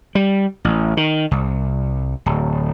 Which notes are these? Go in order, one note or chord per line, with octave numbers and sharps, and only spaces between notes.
G3
A1
D#3
C2
D1